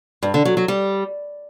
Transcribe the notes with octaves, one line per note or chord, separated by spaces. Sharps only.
G2
D3
F#3
F#3
G3